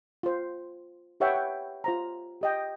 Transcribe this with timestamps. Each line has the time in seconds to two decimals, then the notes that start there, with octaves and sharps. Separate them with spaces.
0.23 F4 C5
1.20 G4 B4 C#5 E5 F#5 G5
1.35 G5
1.84 F4 C5 A#5
2.41 G4 D#5 G5